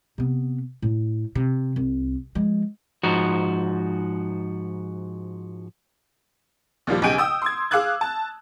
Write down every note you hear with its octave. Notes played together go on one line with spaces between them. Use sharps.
C3 B3
A2
C3
C2
F3 G#3
G#2 F3 D#4 F#4
D#2 A#2 F3 G3
B1 C#3 G4 G#5 G6 D7
G5 D#6 E6
C6 G#6
G#4 F5 D6 E6 F#6 G#6
A5